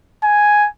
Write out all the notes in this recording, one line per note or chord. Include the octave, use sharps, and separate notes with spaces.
G#5